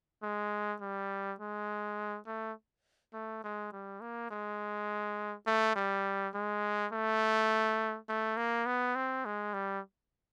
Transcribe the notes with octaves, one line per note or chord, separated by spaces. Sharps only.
G#3
G3
G#3
A3
A3
G#3
G3
A#3
G#3
A3
G3
G#3
A3
A3
A#3
B3
C4
G#3
G3